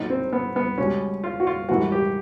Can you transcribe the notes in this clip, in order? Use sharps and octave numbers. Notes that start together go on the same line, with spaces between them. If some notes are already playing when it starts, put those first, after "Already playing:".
Already playing: B1 A#2 F#3 D#4
C4
B3
B3
C#2 B2 G3 C#4
F4
F#4
F4
A#1 G#2 E3 G3 F#4
G4